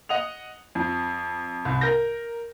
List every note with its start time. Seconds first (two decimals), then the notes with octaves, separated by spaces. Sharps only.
0.09 D#5 F#5 D#6 F7
0.75 F2
1.65 C2
1.81 A#4 G6 A#6